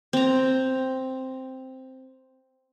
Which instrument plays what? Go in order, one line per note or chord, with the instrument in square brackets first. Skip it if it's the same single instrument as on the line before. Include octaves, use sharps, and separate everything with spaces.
[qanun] C4 A#5